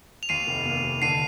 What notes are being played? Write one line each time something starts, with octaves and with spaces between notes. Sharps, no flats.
F7
D#2 C7 D#7
F1
A#3
F1
D3 C7 D#7